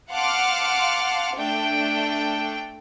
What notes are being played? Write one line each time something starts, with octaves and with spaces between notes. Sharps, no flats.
F5 F#5 A5 C6 D6 F6
A3 D4 G5